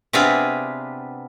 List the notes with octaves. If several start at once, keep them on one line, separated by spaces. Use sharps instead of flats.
C3 B3 C4 D4 F4 G#4